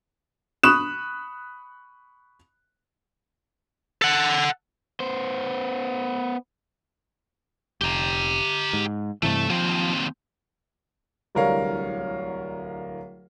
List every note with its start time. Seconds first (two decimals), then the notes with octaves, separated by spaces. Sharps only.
0.63 B5 C#6 D#6 F#6 E7
4.02 A4 F#5
5.00 B3 C5
7.81 F1 G4 A#5
8.73 G#2
9.23 G2 C3 E3 A3
9.50 D#2 F3 C4
11.35 D1 C2 D3 A#4 C#5 F5